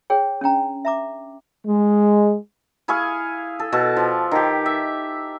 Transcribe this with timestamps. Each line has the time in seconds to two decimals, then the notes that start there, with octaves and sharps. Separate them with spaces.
0.10 G#4 C#5 G5
0.41 C#4 D4 G5 A#5
0.85 E5 A#5 D6
1.65 G#3
2.88 E4 G#4 F5 C#6
3.60 A4
3.72 B2 A4 A5 C#6
3.97 F3
4.31 D#3 G4
4.66 E5